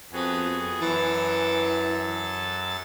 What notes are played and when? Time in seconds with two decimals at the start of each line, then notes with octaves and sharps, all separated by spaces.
0.13 F2 B3 F#4 G#4
0.81 F#2 E3 A4 A6